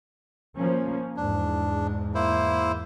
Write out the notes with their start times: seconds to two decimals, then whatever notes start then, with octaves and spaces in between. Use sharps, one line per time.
0.57 F3 A#3 C#4
1.17 E2 G#2 D4
2.15 A#3 E4 C5